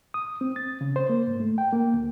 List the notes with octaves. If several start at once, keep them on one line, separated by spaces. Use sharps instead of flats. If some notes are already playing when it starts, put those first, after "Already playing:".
D#6
C4
A6
C#3
C5
A#3
G#2
A3
G5
A#3
D2